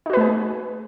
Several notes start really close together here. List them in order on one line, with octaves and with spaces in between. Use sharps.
D#4 F#4 B4 A3 G#4